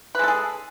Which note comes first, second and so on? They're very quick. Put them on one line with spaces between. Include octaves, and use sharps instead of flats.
B4 G#3 A4 G#4